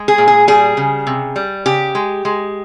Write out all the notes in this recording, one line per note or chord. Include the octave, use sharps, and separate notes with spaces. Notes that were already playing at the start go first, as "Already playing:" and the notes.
Already playing: G#3
G#4
A#2
G#4
G3 G#4
C#3
C3
G3
C#3 G4
G#3
G#3